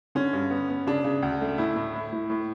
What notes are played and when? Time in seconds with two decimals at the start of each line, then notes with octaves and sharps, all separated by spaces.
0.15 D3 C#4
0.33 G2
0.51 B3
0.69 B3
0.87 C#3 D4
1.04 C#3
1.23 D2
1.41 A3
1.58 A2 E4
1.76 A2
1.94 A2
2.13 A2
2.30 A2